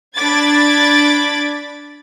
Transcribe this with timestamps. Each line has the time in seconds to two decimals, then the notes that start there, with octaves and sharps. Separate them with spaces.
0.16 D4 B5 D6 G#6 A6